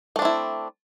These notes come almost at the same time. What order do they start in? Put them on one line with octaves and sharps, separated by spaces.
A3 D4 C4 E4